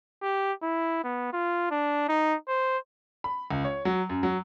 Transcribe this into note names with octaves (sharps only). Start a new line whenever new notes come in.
G4
E4
B3
F4
D4
D#4
C5
B5
C#2
C#5
F#3
F#2
F#3